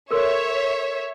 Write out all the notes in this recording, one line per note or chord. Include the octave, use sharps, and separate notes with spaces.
A4 A#4 C#5 E5 C6